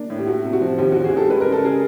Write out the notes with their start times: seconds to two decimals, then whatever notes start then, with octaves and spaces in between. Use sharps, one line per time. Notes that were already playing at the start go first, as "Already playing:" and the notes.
Already playing: A#3 D4
0.10 A2
0.18 G4
0.27 A3 F#4
0.45 C3
0.53 F#4
0.61 F3
0.78 D#2 G4
0.92 F#4
0.95 D#2
1.04 F#4 G#4
1.13 G3 G4 A4
1.29 G#3 B4
1.41 A#4
1.46 C#3
1.52 A4
1.65 G#4 A#4